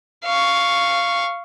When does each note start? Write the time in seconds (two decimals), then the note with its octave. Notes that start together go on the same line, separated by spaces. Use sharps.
0.25 F5 C#6